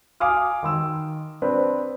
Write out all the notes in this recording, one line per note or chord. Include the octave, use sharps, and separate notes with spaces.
F5 G#5 D6 D#6 F6
D#3 C6 E6
C4 D4 B4